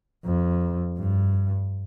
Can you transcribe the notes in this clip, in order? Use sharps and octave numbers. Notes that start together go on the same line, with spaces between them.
F2
G2